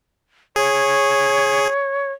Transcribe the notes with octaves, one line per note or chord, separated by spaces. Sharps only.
G#4 C#5